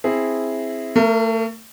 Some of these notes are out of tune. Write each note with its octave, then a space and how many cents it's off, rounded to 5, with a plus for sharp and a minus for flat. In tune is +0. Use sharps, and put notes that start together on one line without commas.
C4 +5 E4 -5 G#4 +0
A3 +35 A#4 -5